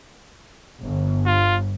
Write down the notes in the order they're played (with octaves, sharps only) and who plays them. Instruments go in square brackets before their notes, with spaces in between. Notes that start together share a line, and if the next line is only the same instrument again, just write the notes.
[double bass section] G1
[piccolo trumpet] F4